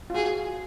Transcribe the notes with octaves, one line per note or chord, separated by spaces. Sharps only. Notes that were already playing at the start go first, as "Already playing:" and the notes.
F4
F#4 G#4